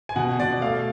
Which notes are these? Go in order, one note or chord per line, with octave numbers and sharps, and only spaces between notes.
G#5
B2 F#5
B2 D5
A3 F5